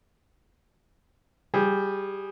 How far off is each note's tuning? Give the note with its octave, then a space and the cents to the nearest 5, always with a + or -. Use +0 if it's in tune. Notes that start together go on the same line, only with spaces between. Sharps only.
G3 +0 G#4 -15